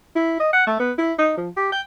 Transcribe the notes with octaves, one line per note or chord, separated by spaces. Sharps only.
E4
D#5
F#5
A3
B3
E4
D#4
F3
G4
G5